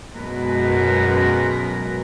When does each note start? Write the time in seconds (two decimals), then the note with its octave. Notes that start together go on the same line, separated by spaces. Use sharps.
0.18 F#2 B2 F#3 G#3 A#4 B4